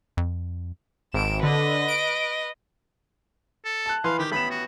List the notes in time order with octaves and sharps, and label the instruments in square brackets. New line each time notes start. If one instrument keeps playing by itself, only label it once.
[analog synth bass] F2
[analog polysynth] G#1 [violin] D7 E7
[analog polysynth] D3 [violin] B4 D#5
[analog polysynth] D7
[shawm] A4
[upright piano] A5 F#6
[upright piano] E3 B4 C6 [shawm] F5
[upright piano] D#3 G6 [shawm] G4
[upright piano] A1 B3 E7 [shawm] B5
[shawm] F#4